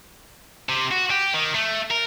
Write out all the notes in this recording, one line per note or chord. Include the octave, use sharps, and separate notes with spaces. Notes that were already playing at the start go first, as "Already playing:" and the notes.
C3
F#4
G4
D#3
A3
A#4